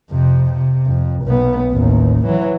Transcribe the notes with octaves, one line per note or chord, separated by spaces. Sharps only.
F2 C3
C3
F2
B1 B3
A1 D#2
E3 F#3